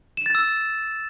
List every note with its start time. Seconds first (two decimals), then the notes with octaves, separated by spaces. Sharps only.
0.17 E7
0.26 A6
0.35 E6